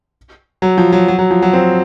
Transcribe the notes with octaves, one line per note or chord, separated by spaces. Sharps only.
F#3
F3
F#3
F#3
F#3
F3
F#3
C4